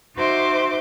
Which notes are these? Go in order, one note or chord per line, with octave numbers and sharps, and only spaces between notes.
D#4 F#4 C5 E5 C6 D6